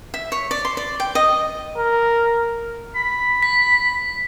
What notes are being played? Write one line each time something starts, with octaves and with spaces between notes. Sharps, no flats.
E5
C#5
D5
C6
D5
G5
D#5
A#4
B5
B6